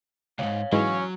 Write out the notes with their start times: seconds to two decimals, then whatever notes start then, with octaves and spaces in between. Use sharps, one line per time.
0.39 C#2 G#2 C#5 F5
0.72 G#2 E3 F#3 G#3 C#4